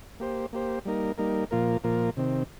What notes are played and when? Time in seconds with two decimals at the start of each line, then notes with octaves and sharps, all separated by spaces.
0.20 A#3 G4 C5
0.53 A#3 G4 C5
0.85 G3 A#3 D#4 A#4
1.18 G3 A#3 D#4 A#4
1.51 A#2 F3 A#3 F4 A#4
1.84 A#2 F3 A#3 F4 A#4
2.17 C3 D#3 C4